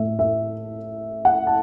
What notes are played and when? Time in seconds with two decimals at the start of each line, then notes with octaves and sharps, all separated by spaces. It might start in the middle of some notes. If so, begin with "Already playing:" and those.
Already playing: A2 A3 E5
0.19 E5
1.25 F#5
1.47 A5